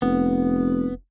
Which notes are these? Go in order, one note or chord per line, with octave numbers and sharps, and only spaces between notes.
F1 B3